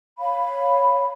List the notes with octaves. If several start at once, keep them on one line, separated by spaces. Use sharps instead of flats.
C#5 F5 B5